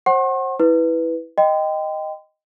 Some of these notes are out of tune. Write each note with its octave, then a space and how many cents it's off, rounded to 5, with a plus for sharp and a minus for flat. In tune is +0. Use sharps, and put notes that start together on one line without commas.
C5 +30 F#5 +15 C6 +45
E4 -10 B4 +0
D#5 +0 G5 +0 C6 -35